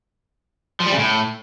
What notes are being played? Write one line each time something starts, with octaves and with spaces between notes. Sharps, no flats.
F3
G3
C#3
A2